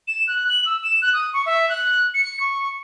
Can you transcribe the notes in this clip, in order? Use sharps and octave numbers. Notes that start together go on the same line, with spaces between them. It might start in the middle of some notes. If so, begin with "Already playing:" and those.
E7
F#6
F#7
E6
E7
F#6
D#6
C#6
E5
F#6
C#7
C#6